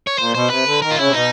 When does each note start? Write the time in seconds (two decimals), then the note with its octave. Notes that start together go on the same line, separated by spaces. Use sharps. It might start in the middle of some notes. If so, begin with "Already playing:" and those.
0.07 C#5
0.18 A#2 C5
0.34 B2 C5
0.50 C3 B4
0.66 D3
0.82 D#3 A#4
0.91 F4
0.97 C#3 E4
1.07 C3
1.13 B2 D#4